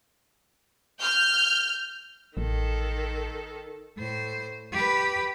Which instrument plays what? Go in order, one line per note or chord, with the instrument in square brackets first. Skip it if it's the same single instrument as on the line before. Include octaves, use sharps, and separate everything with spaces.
[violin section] F6 G6
[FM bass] A1 [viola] D#3 A4
[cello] A2 C5
G4 B4